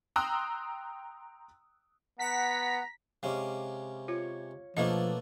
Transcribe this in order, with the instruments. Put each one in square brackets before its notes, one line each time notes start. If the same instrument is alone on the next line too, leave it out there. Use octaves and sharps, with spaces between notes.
[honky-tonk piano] G5 A#5 C6 D#6 E6 F#6
[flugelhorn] B3 [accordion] F#5 [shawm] A#5 [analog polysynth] B6
[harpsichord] C3 G#3 C#4 [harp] F5 D6
[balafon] F4 [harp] C#5
[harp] B2 A4 G#6 [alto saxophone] F3 [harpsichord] A3 A#3 D4 [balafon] D#5